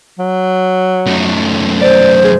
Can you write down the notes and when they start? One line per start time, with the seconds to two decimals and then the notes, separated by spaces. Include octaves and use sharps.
0.19 F#3
1.07 F#2 A3
1.82 C5 D5
2.24 G#4